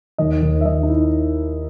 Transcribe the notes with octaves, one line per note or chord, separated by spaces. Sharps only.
D#2 D#5
D#2
E5
D#2 D#5
D#4
E4